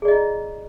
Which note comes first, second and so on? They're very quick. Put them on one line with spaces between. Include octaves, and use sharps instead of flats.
G#4 D5 D#5 E4